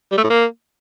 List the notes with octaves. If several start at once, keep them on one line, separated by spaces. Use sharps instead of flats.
G3
A3
A2
A#3